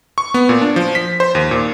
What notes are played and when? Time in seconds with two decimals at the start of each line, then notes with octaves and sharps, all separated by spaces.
0.18 C#6
0.34 B3
0.49 A#2
0.61 D4
0.76 F3
0.95 B6
1.20 C5
1.35 D#2
1.51 A#2